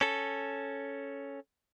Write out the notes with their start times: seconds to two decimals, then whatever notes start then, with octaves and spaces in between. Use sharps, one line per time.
0.01 C#4 A4